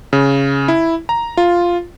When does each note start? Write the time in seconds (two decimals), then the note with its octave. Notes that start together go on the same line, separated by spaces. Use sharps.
0.13 C#3
0.68 E4
1.09 A#5
1.37 F4